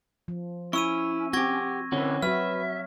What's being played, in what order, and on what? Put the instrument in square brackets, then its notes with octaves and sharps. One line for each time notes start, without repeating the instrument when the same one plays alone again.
[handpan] F3
[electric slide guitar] C#4 [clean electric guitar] E4 [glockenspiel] C#6 E6 D#7
[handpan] C4 [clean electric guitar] F#4 G4 [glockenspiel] C#6 G#6 A#6
[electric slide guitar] D3 E4 [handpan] C4 [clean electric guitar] C#4 F#4
[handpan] F#3 F#4 [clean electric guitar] B4 [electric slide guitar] E5 [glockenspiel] F6